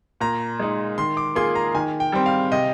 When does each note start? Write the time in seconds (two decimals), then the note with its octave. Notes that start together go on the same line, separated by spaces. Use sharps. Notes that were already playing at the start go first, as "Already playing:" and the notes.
0.21 A#2 A#5
0.60 G#3 D#4
0.98 D#3 C6
1.17 D6
1.35 A#3 F4 G#4 C6
1.55 A#5
1.75 D#3 G#5
2.00 G5
2.12 G3 C4
2.26 F5
2.52 C3 D#5